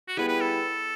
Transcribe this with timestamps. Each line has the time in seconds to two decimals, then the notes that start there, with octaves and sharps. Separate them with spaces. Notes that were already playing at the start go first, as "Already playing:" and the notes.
0.08 F#4
0.17 G3 B3 E4 G#4 B4
0.28 B4
0.41 A4